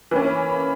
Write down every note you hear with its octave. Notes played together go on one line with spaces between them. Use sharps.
E3 A#3 C#4
B5
B5